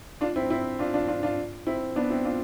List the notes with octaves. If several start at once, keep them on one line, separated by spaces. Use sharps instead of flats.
D4 F4
C4 E4
C4 E4
D4 F4
D4 F4
D4 F4
D4 F4
C4 E4
B3 D4
C4 E4
D4 F4